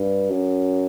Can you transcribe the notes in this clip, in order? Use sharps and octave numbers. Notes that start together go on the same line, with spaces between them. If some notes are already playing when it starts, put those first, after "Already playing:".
Already playing: G2
F#2